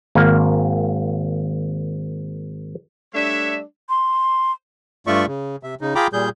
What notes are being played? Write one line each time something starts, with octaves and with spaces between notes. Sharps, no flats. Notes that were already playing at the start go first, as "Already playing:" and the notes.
G#1 A#3
G3 A3 D4 C#5 E5
C6
G2 A3 F4 D5 E5 C#6
C#3
C3 E5
C#3 D#4
F4 G#4 G5 A#5 B5 D6
A#2 G3 G#4 G6